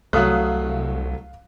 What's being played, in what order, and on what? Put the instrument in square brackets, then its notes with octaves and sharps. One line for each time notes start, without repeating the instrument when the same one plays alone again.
[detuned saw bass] C2 [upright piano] F#3 A3 [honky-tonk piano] F5 D#6 F#6